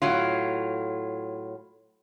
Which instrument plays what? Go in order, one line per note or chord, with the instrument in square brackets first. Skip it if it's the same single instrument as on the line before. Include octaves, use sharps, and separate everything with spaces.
[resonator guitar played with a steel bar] A2 F#3 F4